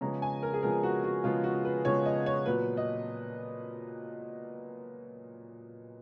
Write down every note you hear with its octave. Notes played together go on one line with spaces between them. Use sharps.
C#3 F3 G#3 B3 A#5
G#5
A#4
G#4
C#3 F3 G#3 B3 A#4
F#4
F#4
C#3 F3 G#3 B3 F4
F#4
B4
C#3 F3 G#3 B3 C#5
D#5
C#5
A#2 F#3 B3 B4
D#5